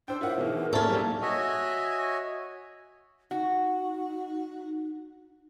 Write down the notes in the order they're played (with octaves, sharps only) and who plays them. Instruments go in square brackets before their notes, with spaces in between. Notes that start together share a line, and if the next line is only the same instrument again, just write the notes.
[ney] D4 [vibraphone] E4 E6 [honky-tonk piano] C5 G5
[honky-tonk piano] E4 F4 F#5 [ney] A#4 [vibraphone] C5 C#5 E5
[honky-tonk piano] B2 E3 [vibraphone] D#4 G#4
[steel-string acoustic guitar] C#4 A4 [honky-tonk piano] C5 D5 A#5 [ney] E5
[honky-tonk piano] A#2 F3 G3 [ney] A#3
[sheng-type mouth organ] F#4 C#5 D#5 E5 G#5
[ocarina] D#4 [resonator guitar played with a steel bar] F#4